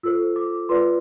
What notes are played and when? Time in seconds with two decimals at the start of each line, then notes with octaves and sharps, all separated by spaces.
0.03 F4 A4 C5 E6
0.36 D6
0.69 F4 B4 D5 C6